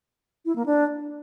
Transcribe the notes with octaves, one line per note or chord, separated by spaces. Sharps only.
E4
A#3
D4